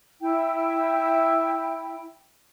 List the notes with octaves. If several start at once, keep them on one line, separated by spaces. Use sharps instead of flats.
E4 G5